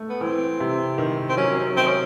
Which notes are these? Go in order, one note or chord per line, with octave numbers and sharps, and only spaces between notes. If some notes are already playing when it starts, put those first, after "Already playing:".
Already playing: A3
B3
E3 C4
C3
D#3
C4
F#3 C#4
D#3 C4
C#4